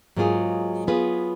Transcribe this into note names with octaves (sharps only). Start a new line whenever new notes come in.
G#2 F#3 A#3 F4 G#4
F#3 B3 F4 G#4 B4